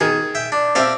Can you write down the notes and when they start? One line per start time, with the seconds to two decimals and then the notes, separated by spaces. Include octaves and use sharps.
0.01 D#3 G#4
0.35 E5 G5
0.52 D4
0.75 C4 G4 E5 F5 A5